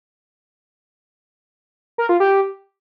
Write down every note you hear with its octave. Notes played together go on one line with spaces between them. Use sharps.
A#4
F4
G4